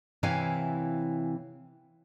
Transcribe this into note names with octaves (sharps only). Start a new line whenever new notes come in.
C3 E3 E4 C#5 F5 G#5